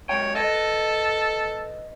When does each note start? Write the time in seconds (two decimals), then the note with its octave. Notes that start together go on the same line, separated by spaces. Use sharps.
0.09 F#2 G#3 C#5 G5
0.35 A4 B4 D#5